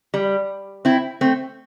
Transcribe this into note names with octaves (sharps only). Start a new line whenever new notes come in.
G3
C4 E4
A3 C4